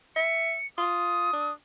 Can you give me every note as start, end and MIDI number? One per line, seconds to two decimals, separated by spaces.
0.16 0.56 76
0.16 0.67 97
0.78 1.30 65
0.78 1.53 87
1.33 1.52 62